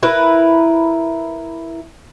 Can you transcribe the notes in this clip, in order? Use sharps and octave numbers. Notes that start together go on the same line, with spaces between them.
E4 A#4 B4